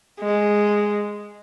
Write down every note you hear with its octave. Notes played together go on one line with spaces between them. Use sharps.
G#3